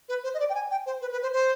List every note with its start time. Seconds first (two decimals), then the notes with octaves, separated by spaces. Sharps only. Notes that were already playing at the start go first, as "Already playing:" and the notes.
0.09 B4
0.24 C5
0.34 D#5
0.39 D5
0.49 G5
0.54 G#5
0.71 G5
0.86 C5
1.01 B4
1.12 B4
1.22 C5
1.33 C5